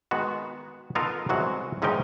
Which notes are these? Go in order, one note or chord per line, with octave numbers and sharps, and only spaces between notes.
D#3 G#3 B3 F#4
B3 D#4 F4 A4 A#4 F5
C2 E3 F#3 G#3 F#4
E2 G#2 C#4 D#4 A#4 G5